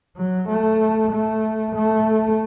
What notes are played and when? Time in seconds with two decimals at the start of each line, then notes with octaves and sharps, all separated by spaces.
0.17 F#3
0.49 A3
1.12 A3
1.75 A3